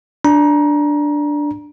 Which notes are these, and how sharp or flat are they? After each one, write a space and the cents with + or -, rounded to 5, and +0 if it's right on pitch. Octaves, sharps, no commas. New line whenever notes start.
D4 +0 A#5 +25